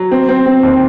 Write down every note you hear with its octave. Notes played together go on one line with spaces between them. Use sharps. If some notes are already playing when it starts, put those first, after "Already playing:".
Already playing: F#3
C4
C4
C4
D#2